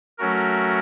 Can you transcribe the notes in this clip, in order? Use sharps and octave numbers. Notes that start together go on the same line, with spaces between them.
F#3 A3 C#4 F#4 A#4